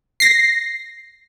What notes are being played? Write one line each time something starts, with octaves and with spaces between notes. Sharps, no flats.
A#6 C7